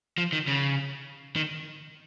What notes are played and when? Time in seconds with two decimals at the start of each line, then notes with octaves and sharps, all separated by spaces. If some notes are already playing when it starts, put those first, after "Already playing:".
0.18 F3
0.33 D#3
0.47 C#3
1.36 D#3